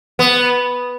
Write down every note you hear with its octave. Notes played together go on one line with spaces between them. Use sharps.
B3